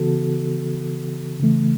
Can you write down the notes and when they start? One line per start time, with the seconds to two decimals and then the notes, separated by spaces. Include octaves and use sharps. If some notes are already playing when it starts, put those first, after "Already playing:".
Already playing: C#3 E3 B3 F#4 A4
1.40 C#3 E3 A3